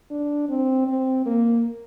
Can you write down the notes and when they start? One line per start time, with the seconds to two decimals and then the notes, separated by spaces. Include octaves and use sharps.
0.11 D4
0.49 C4
0.87 C4
1.26 A#3